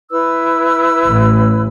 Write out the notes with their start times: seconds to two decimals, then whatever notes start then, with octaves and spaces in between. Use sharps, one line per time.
0.11 E4 B4 E6
1.06 A1